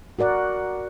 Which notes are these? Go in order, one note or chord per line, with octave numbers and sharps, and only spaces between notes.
F#4 A#4 D5 F#5